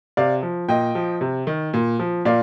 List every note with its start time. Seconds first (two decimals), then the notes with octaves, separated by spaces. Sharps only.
0.17 C3 D5 F5
0.43 F3
0.69 A#2 D#5 G5
0.95 F3
1.21 C3
1.47 D#3
1.74 A#2
1.99 F3
2.25 A#2 D5 F5